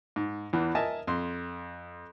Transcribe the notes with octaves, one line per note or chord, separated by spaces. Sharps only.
G#2
E2 E3
A#4 D#5 E5 G#5 A5
F2 C6